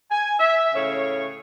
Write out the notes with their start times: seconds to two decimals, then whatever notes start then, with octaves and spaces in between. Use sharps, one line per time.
0.11 G#5
0.39 E5
0.74 A2 C#3 C#5